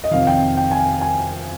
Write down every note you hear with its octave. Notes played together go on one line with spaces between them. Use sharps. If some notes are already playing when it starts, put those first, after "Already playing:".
D#5
F2 C3 D#3 F5
G5
G5
G#5
G#5